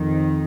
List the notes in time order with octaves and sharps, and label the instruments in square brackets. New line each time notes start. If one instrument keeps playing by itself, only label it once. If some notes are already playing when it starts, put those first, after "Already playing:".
Already playing: [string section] F2 D#3